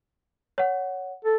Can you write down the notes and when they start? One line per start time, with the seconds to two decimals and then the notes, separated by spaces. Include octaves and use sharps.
0.58 C#5 F#5
1.25 A4